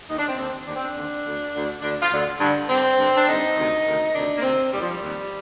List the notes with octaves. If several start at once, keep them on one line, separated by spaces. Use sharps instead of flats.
D#2 D3 D#4
D4
C4
D#2 D3 C4
D#2 D3 D4
C4
D4
D#2 D3
D2 D3
D2 D3
D2 D3 D4
F4
D2 D3
G2 D3
G2 D3 C4
G2 D3
D4
G2 D3 D#4
D2 C3 D#3
D2 C3 D#3
D2 C3 D#3 D4
A#3
D2 C3 D#3 C4
D#2 D#3 G3
F3
G3
D#2 D#3